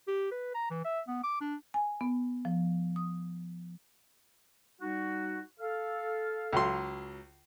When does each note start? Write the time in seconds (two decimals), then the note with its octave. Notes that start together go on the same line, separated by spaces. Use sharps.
0.08 G4
0.31 B4
0.55 A#5
0.70 E3
0.85 E5
1.08 B3
1.24 D6
1.41 D4
1.74 G#5
2.01 B3
2.45 F3
2.96 D#6
4.81 G3 D#4 F#4
5.59 A4 F5
6.52 C#2 F#3 C6